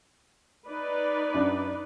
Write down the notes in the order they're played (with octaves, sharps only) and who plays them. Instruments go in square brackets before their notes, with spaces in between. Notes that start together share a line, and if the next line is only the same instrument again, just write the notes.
[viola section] D#4 B4 D5
[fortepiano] F#2 D4